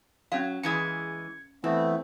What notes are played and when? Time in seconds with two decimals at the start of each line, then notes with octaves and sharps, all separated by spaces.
0.32 F#3 C#4 F5
0.63 E2 E3 G#3 G#6 C#7
1.64 E3 A3 B3 C4